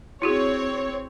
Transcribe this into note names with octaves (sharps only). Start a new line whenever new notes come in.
C4 E4 F#4 G#4 C#5